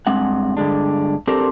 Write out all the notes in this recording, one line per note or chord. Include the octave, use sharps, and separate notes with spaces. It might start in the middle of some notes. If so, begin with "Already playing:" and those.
G2 G#3 C4 F#5
G2 D3 G#3 D4
C4 D4 G4 A4 A#4 C5